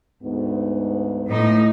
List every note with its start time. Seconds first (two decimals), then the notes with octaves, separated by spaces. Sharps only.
0.22 D2 G#2 B3
1.29 A2 D#4